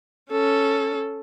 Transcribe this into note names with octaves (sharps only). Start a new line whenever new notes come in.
C#4 A4